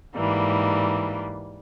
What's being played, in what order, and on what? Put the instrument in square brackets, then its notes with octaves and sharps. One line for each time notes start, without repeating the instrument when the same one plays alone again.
[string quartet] G#2 E3 G3 A#3